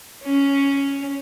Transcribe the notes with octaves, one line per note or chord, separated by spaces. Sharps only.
C#4